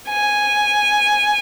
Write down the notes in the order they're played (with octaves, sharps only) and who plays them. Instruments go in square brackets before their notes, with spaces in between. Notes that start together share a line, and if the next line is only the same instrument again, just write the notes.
[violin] G#5